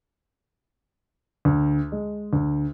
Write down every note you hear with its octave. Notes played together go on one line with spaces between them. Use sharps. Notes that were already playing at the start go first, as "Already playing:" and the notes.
D2
G#3
D2